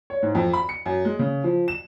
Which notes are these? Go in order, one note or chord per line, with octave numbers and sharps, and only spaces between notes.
C#5
G#2
F2
B5
C#7
F#2
G#3
C#3
F3
E7